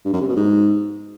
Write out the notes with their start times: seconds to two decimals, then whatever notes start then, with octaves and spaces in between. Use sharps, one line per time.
0.05 G2
0.13 F#2
0.20 C3
0.28 B2
0.36 G#2